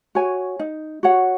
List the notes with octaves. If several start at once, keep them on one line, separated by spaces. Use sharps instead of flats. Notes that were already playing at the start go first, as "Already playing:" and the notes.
F#4 C#5 G#5
D#4
F#4 C#5 F#5